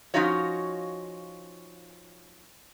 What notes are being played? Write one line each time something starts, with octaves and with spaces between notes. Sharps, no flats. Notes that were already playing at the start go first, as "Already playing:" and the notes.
F3 C#4 D#4 F4 F#4 C#5